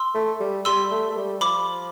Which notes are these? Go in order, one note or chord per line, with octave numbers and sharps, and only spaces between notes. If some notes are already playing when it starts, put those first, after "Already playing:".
Already playing: C6 E6
A3
G3
G3 C6 E6
A3
A3
G3
F3 B5 D6